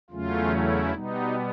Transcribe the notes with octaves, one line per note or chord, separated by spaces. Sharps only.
E2 C#3 F#3 A3 C#4 F4
E4
B2 G3 B3 D#4